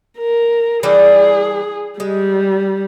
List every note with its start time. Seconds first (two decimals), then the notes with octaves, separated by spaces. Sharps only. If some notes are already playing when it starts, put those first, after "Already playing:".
0.18 A#4
0.83 E3 G3 D4 G#4
2.00 G3 G#3